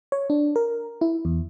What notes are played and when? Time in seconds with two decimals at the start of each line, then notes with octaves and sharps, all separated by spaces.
0.12 C#5
0.30 D4
0.56 A#4
1.01 E4
1.25 E2